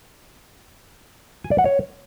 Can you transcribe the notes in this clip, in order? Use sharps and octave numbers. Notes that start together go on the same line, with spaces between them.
G#5
D5
F#5
C#5